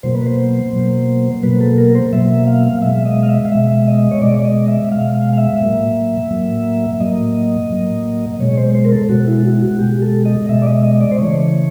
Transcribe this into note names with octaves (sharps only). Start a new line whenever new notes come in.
B2 F#3 A#3 C5
B4
C5
B2 F#3 A#3
B2 F#3 A#3 B4
A4
A#4
C5
B2 F#3 A#3 E5
F5
B2 G#3 E5
D#5
F5
E5
F5
B2 G#3 E5
D#5
C#5
B2 G#3 D5
D5
D#5
E5
B2 G#3 F5
F5
F5
E5
A2 F#3 A#3
A2 F#3 A#3
A2 F#3 A#3 D#5
A2 F#3 A#3
B2 G#3 C#5
C5
C5
A#4
A4
B2 G#3 F#4
E4
F#4
F#4
B2 G#3 G4
A4
D#5
B2 G#3 E5
D5
D#5
D#5
D5
C5
C#3 E3 A3 C#5